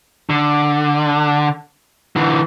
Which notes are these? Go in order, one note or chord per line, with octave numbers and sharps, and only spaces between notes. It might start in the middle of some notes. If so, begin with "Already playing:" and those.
D3
D3 E3